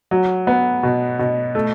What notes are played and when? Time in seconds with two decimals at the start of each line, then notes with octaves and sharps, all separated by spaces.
0.11 F#3
0.47 B3
0.83 B2
1.19 B2
1.55 A3